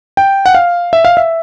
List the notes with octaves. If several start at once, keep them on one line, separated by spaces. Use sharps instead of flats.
G5
F#5
F5
E5
F5
E5